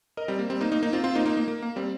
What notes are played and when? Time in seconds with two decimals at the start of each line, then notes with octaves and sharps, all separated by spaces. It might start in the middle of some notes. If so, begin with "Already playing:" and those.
0.17 A#4 D#5
0.28 G3 C4
0.39 A#3
0.50 G3 C4
0.61 A#3 D#4
0.72 A#3 D#4
0.83 A#3 D#4
0.93 C4 F4
1.04 C4 F4
1.15 A#3 D#4
1.26 A#3 D#4
1.37 A#3
1.48 A#3
1.62 A#3
1.76 G3 C4